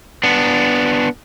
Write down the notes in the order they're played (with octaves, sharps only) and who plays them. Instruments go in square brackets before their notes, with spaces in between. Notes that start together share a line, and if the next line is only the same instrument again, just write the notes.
[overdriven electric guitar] B3 D4